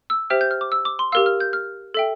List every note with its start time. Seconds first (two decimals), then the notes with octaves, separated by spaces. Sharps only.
0.10 E6
0.30 G4 C5 E5 G5 F6
0.41 G6
0.51 F6
0.61 D6
0.72 E6
0.85 D6
0.99 C6
1.12 G4 A#4 F5 E6
1.26 F6
1.40 G6
1.53 F6
1.94 A4 E5 G5